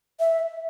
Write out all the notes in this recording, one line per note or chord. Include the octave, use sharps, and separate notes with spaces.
E5